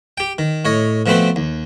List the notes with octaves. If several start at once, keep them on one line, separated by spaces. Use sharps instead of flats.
G4 G5
D#3
A2 C#5 D#5
B2 F3 A3 C4 B4 C5
D#2